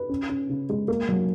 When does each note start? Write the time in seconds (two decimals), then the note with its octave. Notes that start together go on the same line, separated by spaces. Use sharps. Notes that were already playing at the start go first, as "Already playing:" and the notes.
Already playing: B4
0.09 C#4
0.29 C#4
0.49 C#3
0.69 G#3
0.88 A#3
1.08 F#3